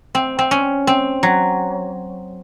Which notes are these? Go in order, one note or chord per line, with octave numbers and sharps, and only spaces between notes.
C4
C4
C#4
C4
F#3